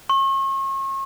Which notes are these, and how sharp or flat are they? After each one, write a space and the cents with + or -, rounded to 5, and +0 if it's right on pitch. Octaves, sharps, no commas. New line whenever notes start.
C#6 -40